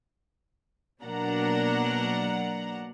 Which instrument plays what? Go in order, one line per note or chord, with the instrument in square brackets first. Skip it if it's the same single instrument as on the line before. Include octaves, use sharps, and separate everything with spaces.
[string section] B2 F#3 A#3 D4 F#5 A#5